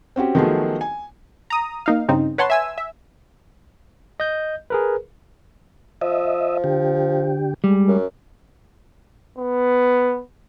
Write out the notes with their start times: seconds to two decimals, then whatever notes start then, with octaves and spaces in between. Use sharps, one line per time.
0.16 C4 C#4 F#4 G4
0.35 D#3 F3 F#3 A3 B3 G#4
0.81 G#5
1.50 A#5 D#6
1.86 A#3 D#4 F5
2.08 G2 C#3 C4 D#4
2.38 B4 C#5 F#5 A5 C6
2.50 E5 G#5 E6
2.78 E5
4.20 D#5 G6
4.70 G#4 A#4 B4
6.02 F3 D#5 E5
6.64 D3 G4
7.64 G3 G#3
7.88 F#2
9.38 B3